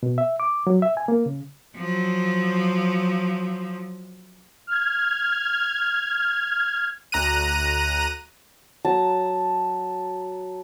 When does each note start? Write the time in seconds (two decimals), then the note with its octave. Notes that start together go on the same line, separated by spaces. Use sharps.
0.03 B2
0.18 E5
0.40 D6
0.67 F#3
0.82 E5
0.97 G#5
1.08 A#3
1.26 C#3
1.77 F3 F#3
4.67 F6 G#6
7.12 D2 A#5 F#6 D#7
8.85 F#3 A5 A#5